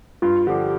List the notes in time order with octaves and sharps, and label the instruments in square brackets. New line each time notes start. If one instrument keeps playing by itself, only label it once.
[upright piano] G2 [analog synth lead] F4
[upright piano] D3 F3 [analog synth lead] G4